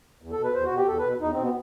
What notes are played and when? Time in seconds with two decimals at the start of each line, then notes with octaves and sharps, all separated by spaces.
0.22 E2
0.32 A4
0.38 B2
0.44 B4
0.54 E2 C5
0.65 F#4
0.71 B2
0.77 G4
0.88 E2 A4
0.99 B4
1.04 B2
1.21 E2 D#4
1.33 B2 C4
1.43 B3